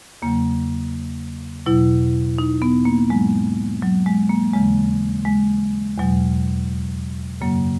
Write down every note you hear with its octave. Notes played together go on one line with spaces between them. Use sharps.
E2 C#3 F#3 A#3
E2 B2 F#3 E4
D#4
B3
A#3
G#2 F#3 G#3
F#3
G#3
A#3
D#2 C#3 E3 G#3
G#3
E2 B2 F#3
F#2 C#3 F#3 A#3